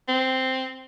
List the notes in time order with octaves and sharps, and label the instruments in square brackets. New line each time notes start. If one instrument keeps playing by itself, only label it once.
[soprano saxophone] C4